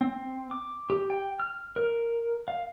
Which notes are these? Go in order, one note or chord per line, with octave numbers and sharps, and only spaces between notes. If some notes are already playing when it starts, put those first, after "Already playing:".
C4
D6
G4
G5
F6
A#4
F5